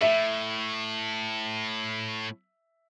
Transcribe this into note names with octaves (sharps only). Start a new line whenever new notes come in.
A2 E5